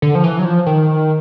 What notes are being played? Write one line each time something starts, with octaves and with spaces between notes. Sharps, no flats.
D3
F3
E3
F#3
F3
D#3